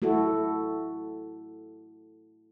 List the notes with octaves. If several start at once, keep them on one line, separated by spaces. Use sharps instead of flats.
A3 E4 F#4 A4